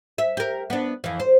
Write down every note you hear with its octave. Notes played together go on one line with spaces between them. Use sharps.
E5
G4 A#4
B3 D4
F2 E3
C5